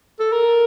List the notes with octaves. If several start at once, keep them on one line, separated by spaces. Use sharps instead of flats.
A4
A#4